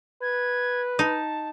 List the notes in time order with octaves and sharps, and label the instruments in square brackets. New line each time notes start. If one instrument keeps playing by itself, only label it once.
[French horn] B4 [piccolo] G#6
[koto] D#4 [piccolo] A5